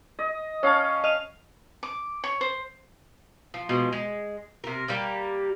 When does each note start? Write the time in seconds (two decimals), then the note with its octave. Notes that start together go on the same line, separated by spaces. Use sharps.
0.19 D#5
0.63 C#4 C#5 F5 A5
1.04 D#5 F6 F7
1.83 D6
2.24 C#5
2.41 C5
3.54 F3
3.69 B2 F3 G#3
3.92 G#3
4.64 C3 A#4
4.88 G3 A#3 G4